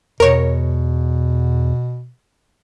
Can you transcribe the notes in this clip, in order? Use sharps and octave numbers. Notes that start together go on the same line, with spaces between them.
E2 B2 A#4 C#5